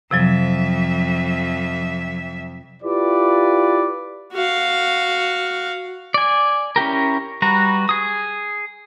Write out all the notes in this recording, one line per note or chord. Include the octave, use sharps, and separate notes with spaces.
F2 C3 F3 F#3 E5
E4 F4 G4 B4 D5
F#4 F5
D5 G#5
C#4 E4 G4 A#4
G3 F#4 B4 A#5
G#4 D#6